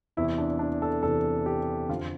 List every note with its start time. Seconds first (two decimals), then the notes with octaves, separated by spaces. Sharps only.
0.17 E2 C3 E3 E4
0.38 D4
0.59 D4
0.82 A4
1.03 E2 C3 E3 A4
1.46 G4
1.89 F2 D3 F4